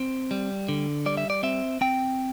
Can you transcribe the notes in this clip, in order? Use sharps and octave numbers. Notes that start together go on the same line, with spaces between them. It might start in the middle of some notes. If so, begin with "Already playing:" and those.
Already playing: C4
G3
D3
G3 D5
E5
D5
C4 E5
C4 G5